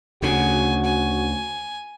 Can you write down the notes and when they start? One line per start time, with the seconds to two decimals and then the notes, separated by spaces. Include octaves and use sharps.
0.22 D2 C#3 F#4 G#5
0.85 G#5